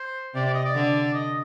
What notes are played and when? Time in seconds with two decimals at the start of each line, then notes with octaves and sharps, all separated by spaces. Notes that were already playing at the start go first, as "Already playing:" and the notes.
Already playing: C5
0.34 C3 D5
0.45 D5
0.54 D#5
0.65 D5
0.75 D3
1.14 D#5